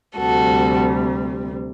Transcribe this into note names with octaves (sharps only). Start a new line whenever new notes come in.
D2 C3 G3 F#4 A4